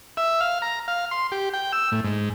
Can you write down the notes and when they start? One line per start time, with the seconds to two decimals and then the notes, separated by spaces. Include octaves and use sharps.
0.17 E5
0.40 F5
0.62 A#5
0.88 F5
1.11 C6
1.32 G4
1.54 G5
1.73 E6
1.92 A2
2.04 G#2